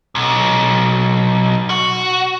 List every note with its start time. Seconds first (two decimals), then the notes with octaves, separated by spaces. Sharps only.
0.15 B1
1.70 F#4